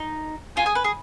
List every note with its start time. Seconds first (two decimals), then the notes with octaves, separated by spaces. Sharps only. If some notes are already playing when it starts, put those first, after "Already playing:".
Already playing: D#4
0.56 F4 G#5
0.66 G#4
0.75 B4
0.84 G#4